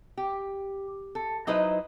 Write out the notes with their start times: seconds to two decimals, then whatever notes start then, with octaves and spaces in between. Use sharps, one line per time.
0.17 G4
1.15 A4
1.47 F#3 D#4 E4 B4 C5 D#5